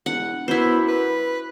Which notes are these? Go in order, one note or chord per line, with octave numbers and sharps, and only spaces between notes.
E1 F#5
F#2 B3 E4 C5
B4